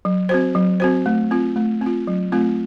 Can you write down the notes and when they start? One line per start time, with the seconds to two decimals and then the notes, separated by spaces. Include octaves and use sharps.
0.05 F#3
0.29 C4 F#4 C5
0.55 F#3
0.80 C4 F#4 C5
1.06 A3
1.31 C4 F4
1.56 A3
1.81 C4 F4
2.07 F#3
2.32 A3 C4 F4